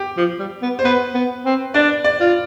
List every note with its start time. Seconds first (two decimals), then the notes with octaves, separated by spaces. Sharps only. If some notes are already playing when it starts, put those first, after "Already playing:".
Already playing: G4
0.17 F3
0.39 G3
0.62 B3
0.79 C5
0.84 B3 B4
1.14 B3
1.45 C4
1.74 D4 D5
2.04 D5
2.20 F4